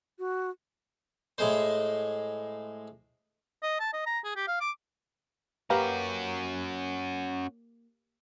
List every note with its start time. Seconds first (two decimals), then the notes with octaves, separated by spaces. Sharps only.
0.19 F#4
1.38 A2 G#3 C5
3.63 D#5
3.80 A5
3.93 D#5
4.06 A#5
4.24 G#4
4.36 G4
4.48 F5
4.61 D6
5.70 A#3 C#4 F#4 G4 B4 F5 A#5